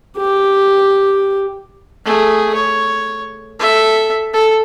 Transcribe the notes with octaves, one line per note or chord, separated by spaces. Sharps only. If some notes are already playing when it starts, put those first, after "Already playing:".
G4
A3 G#4
C#5
A4 E5
A4